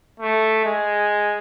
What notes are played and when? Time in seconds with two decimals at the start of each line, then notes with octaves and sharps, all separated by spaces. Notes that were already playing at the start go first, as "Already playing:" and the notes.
0.20 A3
0.65 G#3